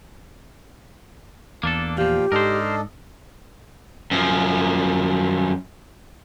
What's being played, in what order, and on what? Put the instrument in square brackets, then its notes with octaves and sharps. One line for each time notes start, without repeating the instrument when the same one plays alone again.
[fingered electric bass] E2 [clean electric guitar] A#3 D4 A4
[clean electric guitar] A#2 F3 [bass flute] G4 [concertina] F5 G5
[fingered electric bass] G#2 [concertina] D4 A4 D#5 [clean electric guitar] A#4 C5
[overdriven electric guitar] F#2 F3